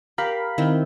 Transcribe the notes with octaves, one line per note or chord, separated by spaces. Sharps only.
G4 A#4 F5 B5
D#3 C4 E4